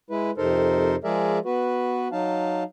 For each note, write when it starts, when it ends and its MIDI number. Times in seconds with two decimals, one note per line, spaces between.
0.10 0.31 56
0.10 0.31 64
0.10 0.31 71
0.38 0.96 41
0.38 0.96 48
0.38 0.96 63
0.38 0.96 69
0.38 0.96 70
0.38 0.96 72
1.04 1.39 53
1.04 1.39 56
1.04 1.39 68
1.04 1.39 70
1.04 1.39 74
1.04 1.39 76
1.45 2.08 59
1.45 2.08 66
1.45 2.08 71
2.12 2.63 54
2.12 2.63 63
2.12 2.63 77
2.12 2.63 81